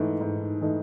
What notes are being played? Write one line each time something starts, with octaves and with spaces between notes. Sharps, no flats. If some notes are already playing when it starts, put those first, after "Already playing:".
Already playing: G#2 E3 A3 D#4
G#2
E3 A3 D#4